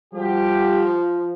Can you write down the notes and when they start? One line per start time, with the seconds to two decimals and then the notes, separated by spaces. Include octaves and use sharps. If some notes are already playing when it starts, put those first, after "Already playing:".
0.14 F3 G3 F#4 G4